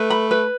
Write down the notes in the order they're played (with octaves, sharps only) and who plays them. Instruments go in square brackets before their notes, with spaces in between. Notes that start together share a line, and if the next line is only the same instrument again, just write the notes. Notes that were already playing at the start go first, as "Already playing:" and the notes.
Already playing: [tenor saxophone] A3 [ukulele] B4
[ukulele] B5
B4